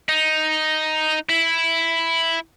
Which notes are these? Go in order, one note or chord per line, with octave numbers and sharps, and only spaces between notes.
D#4
E4